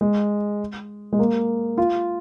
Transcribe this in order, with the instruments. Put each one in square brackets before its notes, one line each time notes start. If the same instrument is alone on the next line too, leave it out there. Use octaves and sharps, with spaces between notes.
[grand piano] G#3
G#3
A#3
F4